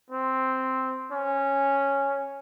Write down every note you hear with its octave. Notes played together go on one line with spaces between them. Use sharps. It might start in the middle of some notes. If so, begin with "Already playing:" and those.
C4
C#4